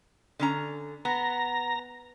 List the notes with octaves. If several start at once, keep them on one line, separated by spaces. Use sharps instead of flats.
D3 C#4 A#5
B3 A#5